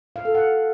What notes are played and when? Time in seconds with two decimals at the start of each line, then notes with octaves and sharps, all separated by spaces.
0.16 F5
0.25 A4
0.35 F#5